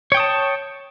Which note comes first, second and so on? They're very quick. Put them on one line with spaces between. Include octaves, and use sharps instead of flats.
C#5 G5 D#6 A5